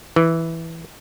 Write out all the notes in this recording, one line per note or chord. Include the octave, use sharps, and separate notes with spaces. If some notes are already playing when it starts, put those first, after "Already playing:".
E3